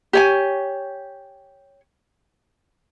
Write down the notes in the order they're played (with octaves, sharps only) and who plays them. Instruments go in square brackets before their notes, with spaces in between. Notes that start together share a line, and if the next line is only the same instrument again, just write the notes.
[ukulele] G4 C#5 G#5